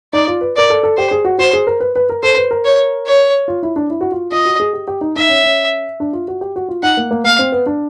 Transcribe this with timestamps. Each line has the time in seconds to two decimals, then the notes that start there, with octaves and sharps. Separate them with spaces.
0.13 D#4 D5
0.28 F4
0.41 B4
0.56 A#4 D5
0.70 A4
0.83 A4
0.97 G4 C5
1.11 G#4
1.25 F#4
1.39 F#4 C5
1.53 G#4
1.67 A#4
1.80 B4
1.96 B4
2.09 A#4
2.23 A4 C5
2.37 B4
2.51 A#4
2.65 C#5
3.06 C#5
3.48 F4
3.63 E4
3.76 D4
3.90 E4
4.01 F#4
4.12 F4
4.31 F4 D#5
4.45 F#4
4.60 G#4
4.73 G4
4.88 G4
5.01 D#4
5.16 D#4 E5
5.29 C#4
5.44 C#4
6.00 D4
6.13 F4
6.28 F#4
6.41 G4
6.56 F#4
6.69 F4
6.83 D#4 F#5
6.97 A#3
7.11 A#3
7.24 A#3 F5
7.39 C4
7.52 B3
7.66 D4